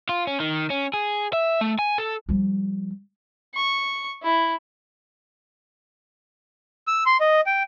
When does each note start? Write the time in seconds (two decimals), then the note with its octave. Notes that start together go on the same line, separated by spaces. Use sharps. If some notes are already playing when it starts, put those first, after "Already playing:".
0.09 F4
0.27 C#4
0.40 D#3
0.70 C#4
0.94 G#4
1.33 E5
1.61 A3
1.79 G#5
1.98 A4
2.29 F3 G3
3.55 C#6
4.23 E4
6.87 E6
7.06 C6
7.21 D#5
7.46 G5